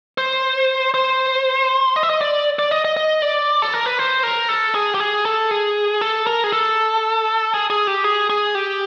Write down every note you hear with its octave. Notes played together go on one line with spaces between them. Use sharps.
C5
C5
D#5
E5
D#5
D5
D5
D#5
D#5
D#5
D5
A4
A#4
B4
C5
A#4
A4
G#4
G4
G#4
A4
G#4
A4
A#4
G#4
A4
G#4
G#4
G4
G#4
G#4
G4